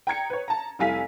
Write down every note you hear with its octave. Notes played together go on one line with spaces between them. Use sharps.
G5 A#5 G#6 C#7
B4 C#5
A5 A#5
F1 G3 E4 F5 G#5 B6